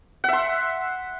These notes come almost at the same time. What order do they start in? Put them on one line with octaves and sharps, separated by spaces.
F#5 E5 C6